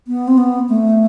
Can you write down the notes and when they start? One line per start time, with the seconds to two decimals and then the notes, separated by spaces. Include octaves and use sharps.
0.08 B3
0.28 C4
0.38 B3
0.69 A3